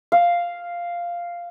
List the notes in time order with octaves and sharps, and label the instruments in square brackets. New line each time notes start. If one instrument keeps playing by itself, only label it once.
[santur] F5